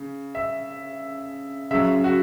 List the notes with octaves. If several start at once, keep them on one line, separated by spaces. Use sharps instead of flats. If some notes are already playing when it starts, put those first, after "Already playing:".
Already playing: C#3
E5
C#3 F#3 E5
F#4